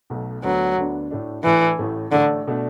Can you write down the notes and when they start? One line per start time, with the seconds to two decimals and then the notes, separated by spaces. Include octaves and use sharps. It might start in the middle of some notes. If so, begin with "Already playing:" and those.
0.10 B1 B2 A3
0.44 D2 D3 F#3 B3 D4
0.78 D2 D3 B3 D4
1.11 A2 A3 D4
1.44 A2 E3 A3 D4
1.79 A1 A2 A3
2.12 A1 A2 D3 A3
2.47 B2 A3 D4